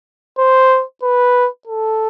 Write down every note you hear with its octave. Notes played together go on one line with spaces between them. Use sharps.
C5
B4
A4